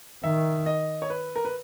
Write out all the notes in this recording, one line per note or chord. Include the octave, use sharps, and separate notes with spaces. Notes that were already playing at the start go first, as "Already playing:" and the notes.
D#3 E5
D#5
C#5
B4
A#4
B4